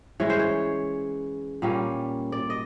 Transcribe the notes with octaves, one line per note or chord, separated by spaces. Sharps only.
E3 G#3 C#4 C#5
C5
C#5
A#2 G3 A#3 C#4
D5
D#5